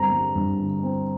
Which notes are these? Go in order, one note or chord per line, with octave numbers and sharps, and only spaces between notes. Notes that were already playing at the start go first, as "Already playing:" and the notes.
Already playing: G2 D3 G3 C4 A#5
G3
G2
D3
C4